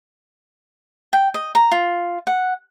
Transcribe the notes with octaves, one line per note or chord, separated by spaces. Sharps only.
G5
D#5
A#5
F4
F#5